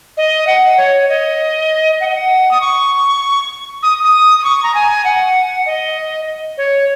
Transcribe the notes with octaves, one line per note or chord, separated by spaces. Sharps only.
D#5
F#5
C#5
D#5
F#5
D#5
F#5
D#6
C#6
D#6
D#6
D#6
C#6
A#5
G#5
F#5
D#5
C#5